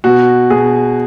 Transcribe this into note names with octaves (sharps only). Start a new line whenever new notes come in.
B2 F#4
B2 G#4